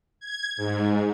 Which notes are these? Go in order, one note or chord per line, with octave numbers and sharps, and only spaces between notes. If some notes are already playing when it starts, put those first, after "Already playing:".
G#6
G#2